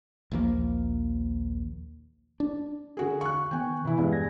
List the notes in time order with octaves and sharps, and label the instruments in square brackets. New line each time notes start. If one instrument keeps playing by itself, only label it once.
[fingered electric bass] A#1 D#2 F3 A#3
D4
[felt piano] D3 F#4 G#4
[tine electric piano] F5 [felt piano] C#6 F#6
[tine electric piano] D#3 B3 C#6 [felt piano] G5 G#5
[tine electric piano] B2 [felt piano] E3 E4
[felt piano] E2 G2 G#3 [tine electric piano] B4 F5
[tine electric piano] G#5 G#6 A#6